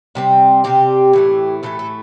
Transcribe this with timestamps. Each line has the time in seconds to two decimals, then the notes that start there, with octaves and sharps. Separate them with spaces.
0.15 C3 G3 C4
0.64 C3 G3 C4 G4
1.13 A2 E3 A3
1.63 A2 E3 A3 A4
1.79 A4